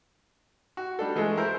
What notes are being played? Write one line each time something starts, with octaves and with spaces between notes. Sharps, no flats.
F#4
G3 D4 A4
E3 G#3 A3 A4
E4 A#4 C5